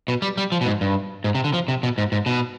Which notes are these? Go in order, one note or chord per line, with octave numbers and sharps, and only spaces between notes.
B2
G3
G3
F3
B2
G#2
G2
G#2
C3
D3
F3
C3
B2
G#2
G#2
B2